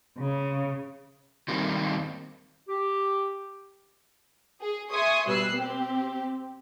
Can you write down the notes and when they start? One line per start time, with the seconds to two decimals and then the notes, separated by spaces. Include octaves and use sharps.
0.18 C#3
1.48 D#3 G3 A#3 C4
2.69 G4
4.62 G#4
4.91 E5 G#5 C6 C#6 D#6
5.27 B2 G3 B4 E6 F#6 C7
5.56 C4 G4